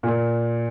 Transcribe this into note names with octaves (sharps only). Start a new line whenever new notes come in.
A#2